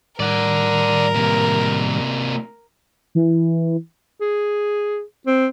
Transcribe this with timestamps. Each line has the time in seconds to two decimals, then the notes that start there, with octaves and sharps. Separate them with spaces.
0.20 A2 D#3 G3 A#4 D5 F#5
1.15 C3 A#3
3.15 E3
4.21 G#4
5.27 C4